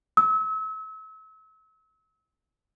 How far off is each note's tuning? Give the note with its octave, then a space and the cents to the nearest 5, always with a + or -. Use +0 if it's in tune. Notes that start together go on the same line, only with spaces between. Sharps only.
E6 -35